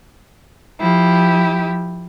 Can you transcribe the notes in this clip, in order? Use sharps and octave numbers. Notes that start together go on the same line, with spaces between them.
F3 E4 G4